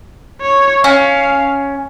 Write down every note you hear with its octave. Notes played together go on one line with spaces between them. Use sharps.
C#5
C#4 F5